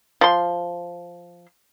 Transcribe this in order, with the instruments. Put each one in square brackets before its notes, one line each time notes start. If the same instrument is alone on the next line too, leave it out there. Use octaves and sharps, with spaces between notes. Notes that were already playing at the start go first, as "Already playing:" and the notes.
[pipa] F3 C6